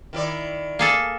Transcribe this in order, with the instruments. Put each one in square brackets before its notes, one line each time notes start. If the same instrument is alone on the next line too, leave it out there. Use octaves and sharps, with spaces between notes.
[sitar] D#3 E4 D5
[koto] A#3 G#4 A4